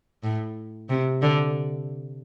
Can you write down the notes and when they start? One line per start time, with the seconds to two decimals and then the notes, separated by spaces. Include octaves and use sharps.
0.23 A2
0.89 C3
1.22 D3